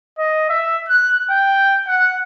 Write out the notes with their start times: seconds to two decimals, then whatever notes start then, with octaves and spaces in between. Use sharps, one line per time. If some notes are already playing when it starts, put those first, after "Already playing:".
0.18 D#5
0.49 E5
0.89 F#6
1.30 G5
1.87 F#5